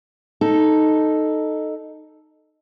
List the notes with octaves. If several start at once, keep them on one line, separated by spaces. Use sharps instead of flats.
D#4 A4